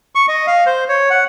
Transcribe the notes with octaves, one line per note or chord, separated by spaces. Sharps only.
C#6
D#5
F5
C5
C#5
F#5